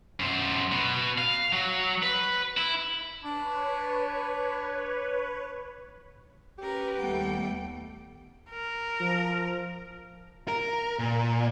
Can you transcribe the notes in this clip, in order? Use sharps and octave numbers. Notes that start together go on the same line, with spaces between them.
F#2 C5
B2
F5
F#3
B4
E4
D4 B4 C#5
C#4 G4 A#4 B4
D#2 G3 A3 B3 F#5 G5
A#4
F3
A#4
A#2